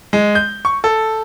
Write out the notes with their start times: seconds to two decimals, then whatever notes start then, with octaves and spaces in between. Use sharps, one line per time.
0.13 G#3
0.35 G6
0.65 C#6
0.84 A4